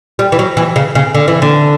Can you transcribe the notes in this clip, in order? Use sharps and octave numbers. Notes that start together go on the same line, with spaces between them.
G3
E3
F#3
E3
C#3
C#3
D3
E3
D3